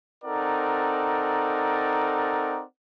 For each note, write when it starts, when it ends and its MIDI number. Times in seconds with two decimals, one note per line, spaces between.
0.25 2.64 60
0.25 2.64 63
0.25 2.64 69
0.25 2.64 70
0.25 2.64 74
0.25 2.64 78